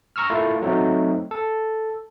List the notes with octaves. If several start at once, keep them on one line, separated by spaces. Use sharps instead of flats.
A#5 C#6 E6 F6
A3 E4 F4 A#4
F#3 A3 C4 D#4 F#4
A4